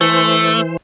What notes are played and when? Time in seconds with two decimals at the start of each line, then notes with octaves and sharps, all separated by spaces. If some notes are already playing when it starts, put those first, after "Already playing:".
0.01 E3 A3 C5